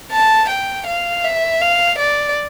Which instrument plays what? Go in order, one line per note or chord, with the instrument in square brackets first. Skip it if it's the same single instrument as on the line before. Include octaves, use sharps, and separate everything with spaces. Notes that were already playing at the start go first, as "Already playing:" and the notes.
[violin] A5
G5
F5
E5
F5
D5